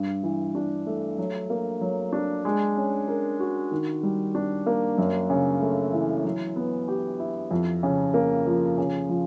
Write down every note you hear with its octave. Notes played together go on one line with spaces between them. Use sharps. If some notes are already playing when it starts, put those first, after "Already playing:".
Already playing: G2
E3
D4
A3
F#3
A#3
F#3
D4
G#3
C#4
A#4
F#4
D#3
G3
D4
A#3
F#2
C#3
A3
E3
F#3
B3
G4
E4
F2
C#3
A#3
F3
C#3
F3